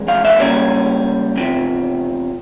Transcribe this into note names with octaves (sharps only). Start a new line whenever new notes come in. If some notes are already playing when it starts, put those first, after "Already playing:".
Already playing: F2 E3 G#3
F5
E5
C#2 C#3 G3 A#3 C#4 C#5
E2 C3 F3